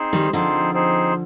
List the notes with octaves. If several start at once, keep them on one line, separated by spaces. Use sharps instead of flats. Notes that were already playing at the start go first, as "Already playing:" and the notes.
Already playing: C4 D#4 G#4 C5
D#3 G3
D3 F3 C4 D#4 G#4 C5
C4 D#4 G#4 C5